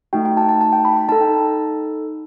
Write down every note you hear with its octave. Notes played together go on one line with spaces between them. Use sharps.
A3 D#4 F#4 G5
G5
A5
A5
A5
G5
B5
B5
D#4 A4 A5
G5